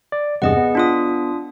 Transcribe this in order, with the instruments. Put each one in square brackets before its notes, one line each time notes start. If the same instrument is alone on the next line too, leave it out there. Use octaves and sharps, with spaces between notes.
[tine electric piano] D5
[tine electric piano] E2 G2 C3 [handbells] G#4 D#5 F#5
[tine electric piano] B3
[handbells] D4 F4 D#6